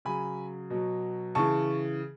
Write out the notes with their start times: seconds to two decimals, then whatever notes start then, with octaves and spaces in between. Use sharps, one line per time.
0.05 C#3 F#3 G#5 B5
0.70 B2 F#3
1.35 C#3 E3 A5 C#6